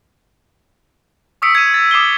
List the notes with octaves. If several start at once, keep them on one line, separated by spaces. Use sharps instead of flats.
C#6 D#6 E6 B6 C#7 D7
G#6 D#7
A6
D6 D#6 C7 D#7 G7